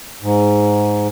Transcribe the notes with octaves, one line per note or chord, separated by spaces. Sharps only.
G#2